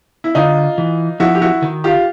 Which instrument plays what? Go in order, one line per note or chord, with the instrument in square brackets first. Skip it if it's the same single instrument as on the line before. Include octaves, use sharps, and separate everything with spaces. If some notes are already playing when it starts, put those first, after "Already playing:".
[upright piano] E4
[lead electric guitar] D3 [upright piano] D#4 F4
[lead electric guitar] E3
[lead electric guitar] F3 [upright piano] E4 F#4
[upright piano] G4
E4 F#4
[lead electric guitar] D#3
[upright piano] F4 G4